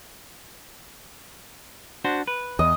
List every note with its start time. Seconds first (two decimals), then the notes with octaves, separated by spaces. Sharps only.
2.05 D4 F#4 C5
2.27 B4
2.59 E2 D#5